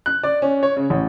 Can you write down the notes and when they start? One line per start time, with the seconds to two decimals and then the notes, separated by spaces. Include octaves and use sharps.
0.06 F#6
0.23 D5
0.42 C#4
0.63 C#5
0.77 C#3
0.90 A1